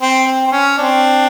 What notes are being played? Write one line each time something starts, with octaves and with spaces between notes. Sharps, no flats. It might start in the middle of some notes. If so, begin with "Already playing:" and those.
C4
C4
C4
C#4
C4 D4